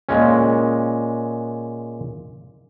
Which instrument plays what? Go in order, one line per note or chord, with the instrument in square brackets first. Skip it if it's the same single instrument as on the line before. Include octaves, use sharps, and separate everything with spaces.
[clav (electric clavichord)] A#2 G#3 C#4